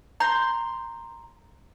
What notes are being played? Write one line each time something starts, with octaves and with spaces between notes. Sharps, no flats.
A#5 C6 G6